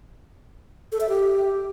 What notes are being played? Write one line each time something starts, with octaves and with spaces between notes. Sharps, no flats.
A4
E5
G4